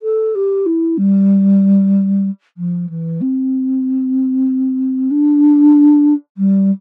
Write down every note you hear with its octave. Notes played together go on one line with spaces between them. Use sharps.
A4
G4
E4
G3
F3
E3
C4
D4
G3